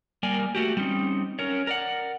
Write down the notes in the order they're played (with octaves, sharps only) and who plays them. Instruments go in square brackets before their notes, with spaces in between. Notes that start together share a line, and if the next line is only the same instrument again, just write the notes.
[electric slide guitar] G3 A#3 A#4 D5 G#5
A3 F#4 G4
G3 C4 C#4 D#4
C#4 A#4 C#5
A#4 D5 F#5